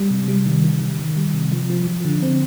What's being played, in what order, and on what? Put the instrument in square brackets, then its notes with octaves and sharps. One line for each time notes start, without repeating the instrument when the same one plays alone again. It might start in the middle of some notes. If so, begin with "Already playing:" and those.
Already playing: [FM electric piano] G3
C3
G3
D#3
D#3
D#3
D#3
G3
C3
F3
F3
F3
D3
C4